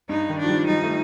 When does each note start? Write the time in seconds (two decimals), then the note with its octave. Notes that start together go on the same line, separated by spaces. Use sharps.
0.09 G2 D#4
0.29 D#3
0.39 F3 D4
0.49 G3
0.67 G3 D#4
0.83 A3